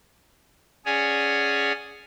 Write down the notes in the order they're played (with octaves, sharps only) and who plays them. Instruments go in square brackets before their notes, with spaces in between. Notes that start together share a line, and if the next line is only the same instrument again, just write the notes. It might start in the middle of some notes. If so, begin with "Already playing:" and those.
[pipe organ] C#4 G#4 C#5 D5 F#5 G#5